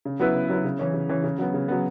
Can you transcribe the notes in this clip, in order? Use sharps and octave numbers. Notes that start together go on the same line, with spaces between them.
C#3
F#3 B3 E4 B4
C#3
F#3 B3 E4 B4
C#3
E3 C#4
C#3
E3 C#4
C#3
F#3 B3
C#3
F#3 B3